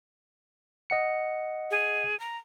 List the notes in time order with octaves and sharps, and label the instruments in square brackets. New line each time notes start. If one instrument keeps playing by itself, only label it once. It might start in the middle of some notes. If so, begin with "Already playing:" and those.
[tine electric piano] D#5 F#5 C#7
[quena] G#4
A#5